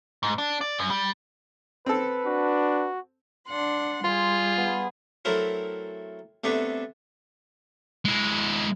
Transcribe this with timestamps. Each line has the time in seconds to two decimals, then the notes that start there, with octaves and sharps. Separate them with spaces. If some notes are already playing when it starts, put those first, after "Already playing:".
0.23 G#2
0.38 D4
0.61 D5
0.79 F#2
0.90 G3
1.86 C4 A4 B4
2.26 D4 F#4
3.47 D4 F#5 C6
4.04 G3 F4 G#4 C6
4.58 B3
5.25 F#3 A3 C4 E4 A#4
6.44 C3 A3 B3 D4
8.05 G#3 E4